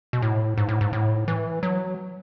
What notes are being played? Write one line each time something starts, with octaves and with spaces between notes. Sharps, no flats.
B2
A2
G#2
A2
G#2
A2
E3
F#3